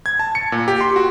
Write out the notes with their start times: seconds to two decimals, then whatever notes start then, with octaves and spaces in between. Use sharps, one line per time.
0.06 G#6
0.19 A5
0.35 C#7
0.52 A#2
0.68 G4
0.81 C6
0.96 F#4